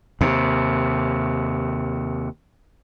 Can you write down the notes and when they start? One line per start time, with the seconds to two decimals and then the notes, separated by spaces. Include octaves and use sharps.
0.21 D#2 C3